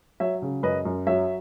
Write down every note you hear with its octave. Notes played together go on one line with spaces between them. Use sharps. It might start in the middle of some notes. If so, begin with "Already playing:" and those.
F#3 C#5 E5
C#3
F#2 B4 D#5
F#2
F#3 C#5 E5